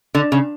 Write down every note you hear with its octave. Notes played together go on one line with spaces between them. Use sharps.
D3
C#3